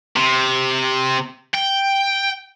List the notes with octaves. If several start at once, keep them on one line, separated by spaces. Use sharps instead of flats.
C3
G5